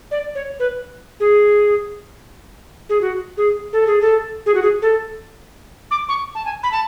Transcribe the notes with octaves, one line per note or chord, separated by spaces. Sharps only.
D5
C#5
B4
G#4
G#4
F#4
G#4
A4
G#4
A4
G#4
F#4
G#4
A4
D6
C#6
A5
G#5
B5
A5